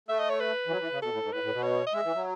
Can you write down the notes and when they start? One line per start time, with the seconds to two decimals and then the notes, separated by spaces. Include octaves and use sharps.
0.08 A3 E5
0.19 D#5
0.29 C#5
0.40 B4
0.67 E3
0.70 F#3
0.81 E3
0.92 C#3
1.02 B2 A4
1.12 A2
1.23 G#2
1.32 A2 B4
1.43 A2
1.54 B2
1.63 C#5
1.87 D#5
1.94 G#3 E5
2.05 E3
2.15 F#3